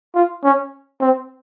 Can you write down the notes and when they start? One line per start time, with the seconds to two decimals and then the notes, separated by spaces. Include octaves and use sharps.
0.15 F4
0.44 C#4
1.01 C4